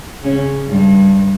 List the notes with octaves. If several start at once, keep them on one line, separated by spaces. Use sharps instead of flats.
C#3 C#4
G2 G3